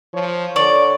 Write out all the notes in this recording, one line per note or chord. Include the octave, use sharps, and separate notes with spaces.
F3 C#5
D3 D5 C#6